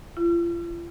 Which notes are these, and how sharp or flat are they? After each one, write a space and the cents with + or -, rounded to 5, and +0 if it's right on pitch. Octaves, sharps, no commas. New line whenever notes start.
F4 -40